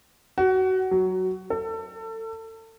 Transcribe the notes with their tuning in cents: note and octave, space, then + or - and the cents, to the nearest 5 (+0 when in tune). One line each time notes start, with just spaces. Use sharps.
F#4 +20
F#3 +5
A4 +30